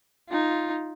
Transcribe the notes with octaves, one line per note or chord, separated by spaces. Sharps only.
D#4 F4